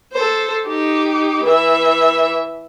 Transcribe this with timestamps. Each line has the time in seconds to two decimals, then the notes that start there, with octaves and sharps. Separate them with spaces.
0.13 A4 C5
0.67 D#4 G4
1.46 E3 E5